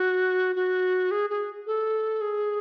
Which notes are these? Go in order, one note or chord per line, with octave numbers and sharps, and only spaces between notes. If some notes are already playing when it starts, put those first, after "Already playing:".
Already playing: F#4
F#4
G#4
G#4
A4
G#4